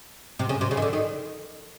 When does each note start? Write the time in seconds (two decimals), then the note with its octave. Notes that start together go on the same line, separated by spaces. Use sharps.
0.39 C3
0.49 C#3
0.61 C3
0.71 C#3
0.77 D#3
0.82 D3
0.93 D#3